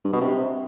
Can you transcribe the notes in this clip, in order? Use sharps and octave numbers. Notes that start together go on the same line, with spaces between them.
G2
B2
C3